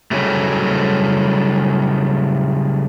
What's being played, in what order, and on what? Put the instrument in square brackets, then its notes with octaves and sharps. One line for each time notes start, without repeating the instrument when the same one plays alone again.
[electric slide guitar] C#3 F#3 G3 A3